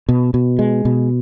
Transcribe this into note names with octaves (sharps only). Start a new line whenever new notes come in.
B2
B2
G#3
B2